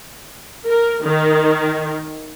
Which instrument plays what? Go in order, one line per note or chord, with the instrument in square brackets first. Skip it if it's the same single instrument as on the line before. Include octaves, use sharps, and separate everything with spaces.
[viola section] A#4
D#3